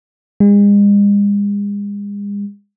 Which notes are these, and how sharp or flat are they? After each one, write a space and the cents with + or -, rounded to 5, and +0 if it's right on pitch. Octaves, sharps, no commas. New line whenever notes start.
G#3 -40